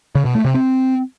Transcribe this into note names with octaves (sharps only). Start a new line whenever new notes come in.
C#3
B2
A3
C3
C4